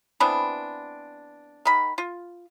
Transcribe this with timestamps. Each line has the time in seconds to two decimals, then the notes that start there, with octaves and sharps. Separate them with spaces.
0.20 E3 B3 C4 D4
1.65 D#3 B5
1.98 F4